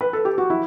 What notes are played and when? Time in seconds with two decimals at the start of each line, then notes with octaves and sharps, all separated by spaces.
0.01 B4
0.13 A4
0.25 G4
0.38 F#4
0.50 F#3 E4